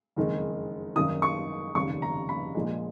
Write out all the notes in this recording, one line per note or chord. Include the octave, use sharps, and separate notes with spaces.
F#1 F2 D#3 G#3
G#1 F#2 D#3 D#6
C#6
F1 D#2 C#3 C#6
A#5
B5
A#1 A#2 F3 G#3